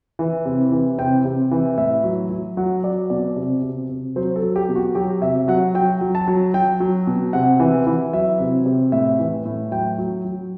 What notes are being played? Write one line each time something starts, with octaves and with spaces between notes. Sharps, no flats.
E3
C3
E3
C3 G5
C3
E3
A2 E5
F#3
F#3
F#3 F#5
F#3 D5
B2 D5
C3
C3
C3
F#3 C5
A4
F#3
G4
B2
F#4
F#3 G4
C3 E5
F#3 F#5
F#3 G5
F#3
A5
F#3
F#3 G5
F#3
B2
C3 F#5
E3
E3
F#3 E5
C3
C3
A2 E5
E3
A2
F#3 G5
F#3
F#3